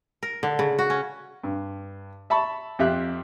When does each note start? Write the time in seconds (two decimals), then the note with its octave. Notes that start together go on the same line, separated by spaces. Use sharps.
0.23 A#4
0.43 D3
0.59 C#3
0.79 F#4
0.90 C#4
1.44 G2
2.30 E5 A5 B5 C#6
2.79 F2 G4 E5 F5 F#6